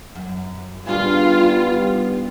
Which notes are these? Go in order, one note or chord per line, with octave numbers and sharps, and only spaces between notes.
F#2
D#3 G3 B3 D4 F4 G#4